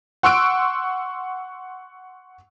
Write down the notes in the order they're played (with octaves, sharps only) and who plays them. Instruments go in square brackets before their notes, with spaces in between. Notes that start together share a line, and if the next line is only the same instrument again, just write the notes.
[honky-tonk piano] F#5 C6 C#6 E6 F#6 D7